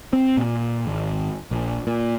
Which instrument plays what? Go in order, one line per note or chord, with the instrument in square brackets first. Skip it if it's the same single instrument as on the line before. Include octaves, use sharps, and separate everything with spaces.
[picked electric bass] C4
A#2
G#1
A#1
A#2